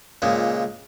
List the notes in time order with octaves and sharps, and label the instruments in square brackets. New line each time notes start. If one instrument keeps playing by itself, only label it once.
[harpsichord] C#2 A#2 G#3